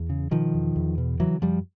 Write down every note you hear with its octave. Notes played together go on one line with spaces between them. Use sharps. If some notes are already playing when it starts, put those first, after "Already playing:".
Already playing: E2
C#3
B2 D#3 F3
E2
E2
B2
C#3 E3 F#3
F#2 F3 G3